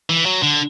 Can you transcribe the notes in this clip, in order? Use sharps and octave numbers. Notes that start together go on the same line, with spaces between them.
E3
F#3
D3